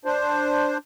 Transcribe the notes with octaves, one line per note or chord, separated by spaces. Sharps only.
D4 C5